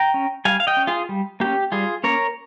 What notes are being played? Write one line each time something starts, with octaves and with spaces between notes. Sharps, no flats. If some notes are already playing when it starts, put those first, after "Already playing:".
Already playing: G5 A#5
C#4
G3 F5 G#5
F5
D#5 G5
C#4
F4 G#4
G3
A#3 C#4 G4
G3 F4 G#4
A#3 C#4 A#4 C#5